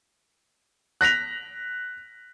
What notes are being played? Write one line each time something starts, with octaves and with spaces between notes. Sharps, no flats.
F#6 A#6 B6 F7